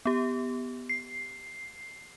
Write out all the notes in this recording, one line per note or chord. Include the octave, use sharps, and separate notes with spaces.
B3 G4
C7